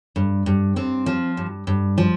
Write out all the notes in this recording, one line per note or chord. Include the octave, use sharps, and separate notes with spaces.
G2
G2
G2 C4
F3
G2
G2
F3